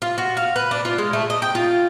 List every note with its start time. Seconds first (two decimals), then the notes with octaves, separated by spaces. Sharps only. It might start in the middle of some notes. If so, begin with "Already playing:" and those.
0.02 F4
0.18 F#4
0.37 F5
0.56 B4
0.71 D4
0.85 F4
0.98 G#3
1.13 A3
1.30 D#5
1.42 G5
1.55 F4